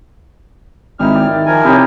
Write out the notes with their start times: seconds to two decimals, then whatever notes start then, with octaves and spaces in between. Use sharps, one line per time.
0.99 G#1 G3 D#4 E4 F6
1.15 D5
1.28 D#3
1.46 F3 A#4 G#5
1.64 C3 D#4 E4 G4 C#5